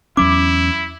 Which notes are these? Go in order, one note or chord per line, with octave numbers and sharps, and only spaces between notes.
E2 F#3 C#4 E4 D6